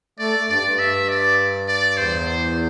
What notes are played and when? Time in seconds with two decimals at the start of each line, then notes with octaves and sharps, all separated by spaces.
0.19 A3 D5
0.49 G2 D5
0.64 G2
0.79 E5
1.09 D5
1.68 D5
1.97 E2 C5